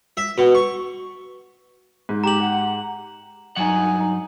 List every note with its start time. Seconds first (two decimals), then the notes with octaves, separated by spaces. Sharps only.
0.17 E5
0.38 B2
0.55 C#6
2.09 G#2
2.24 G4 A#5 F#7
2.41 F#5
3.56 G2 F#3 D#4 F#5 G#5